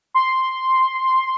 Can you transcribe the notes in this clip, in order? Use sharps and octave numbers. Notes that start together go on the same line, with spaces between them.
C6